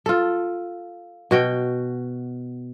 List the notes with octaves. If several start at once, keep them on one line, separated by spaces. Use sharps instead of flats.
F4 A4
B2 F#4 G5